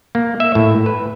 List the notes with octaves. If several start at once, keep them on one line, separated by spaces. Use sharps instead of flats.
A#3
E5
A2
B4